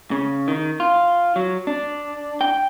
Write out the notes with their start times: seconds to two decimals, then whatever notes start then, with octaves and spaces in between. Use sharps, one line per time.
0.11 C#3
0.48 D#3
0.80 F4
1.36 F#3
1.67 D4
2.41 G5